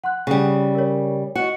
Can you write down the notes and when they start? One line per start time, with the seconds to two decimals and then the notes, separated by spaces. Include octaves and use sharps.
0.04 F#5 C6 F#6
0.27 C#3 G3
0.75 A#4 C#5
1.35 F#4 D#5 C#7